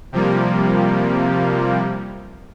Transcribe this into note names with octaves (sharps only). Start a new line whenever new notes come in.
C3 F3 G3 A#3